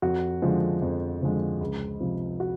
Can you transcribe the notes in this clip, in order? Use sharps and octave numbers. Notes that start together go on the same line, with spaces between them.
F2 F#4
D3 F3 G#3
F2
D3 F3 G#3
C#2
C3 F3
F#4